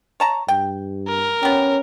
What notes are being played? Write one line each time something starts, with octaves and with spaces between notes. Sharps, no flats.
C#5 A5 A#5
G2 G5
A#4
B3 C#4 G4